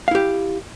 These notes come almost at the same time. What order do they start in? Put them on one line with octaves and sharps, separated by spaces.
F5 E4 G4